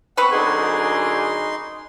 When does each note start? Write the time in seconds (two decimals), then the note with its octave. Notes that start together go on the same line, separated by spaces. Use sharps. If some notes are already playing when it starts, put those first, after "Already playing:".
0.17 B3 C4 B4 F#5 B5 C#6
0.31 F#2 D3 D#4 G#4 C6